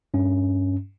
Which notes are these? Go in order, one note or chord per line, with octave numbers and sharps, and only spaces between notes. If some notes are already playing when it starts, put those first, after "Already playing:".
G2 C#4